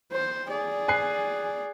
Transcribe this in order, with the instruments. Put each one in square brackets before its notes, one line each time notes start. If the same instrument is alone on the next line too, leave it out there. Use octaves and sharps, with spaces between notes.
[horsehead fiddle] C5
G#4 D5
[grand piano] G#5 F#6 C7